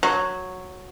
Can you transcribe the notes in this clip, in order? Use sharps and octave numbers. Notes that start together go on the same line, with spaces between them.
F#3